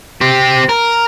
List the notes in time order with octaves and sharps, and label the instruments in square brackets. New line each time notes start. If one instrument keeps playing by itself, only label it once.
[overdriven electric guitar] C4 G4
A#4